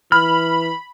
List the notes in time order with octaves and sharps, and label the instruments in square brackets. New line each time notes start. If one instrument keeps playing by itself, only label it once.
[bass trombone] E3 [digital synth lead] B5 [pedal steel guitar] F6